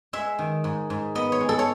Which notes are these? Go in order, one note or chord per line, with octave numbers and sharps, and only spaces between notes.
G#3 E5
D#3
G#2
G#2
B3 D#5
C#5
G#3
A4
C#5